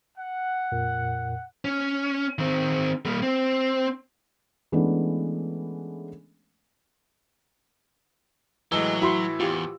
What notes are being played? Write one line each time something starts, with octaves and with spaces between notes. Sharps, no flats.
F#5
F2 A#2 A#4
C#4
D#3 C4
G3 A#3
C4
E3 G#3 A3 B3 C#4 D4
A2 E3 F#3 G#3 E6
E4 F#4 B5 C6
E2 F4 G4